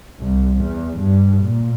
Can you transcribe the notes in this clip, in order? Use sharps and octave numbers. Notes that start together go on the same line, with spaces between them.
C2
E2
G2
A#2